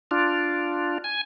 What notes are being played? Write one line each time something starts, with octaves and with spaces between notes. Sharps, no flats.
D4 F4
G#5